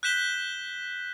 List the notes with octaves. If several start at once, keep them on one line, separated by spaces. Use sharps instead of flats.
F#6 G6 B6 E7 G7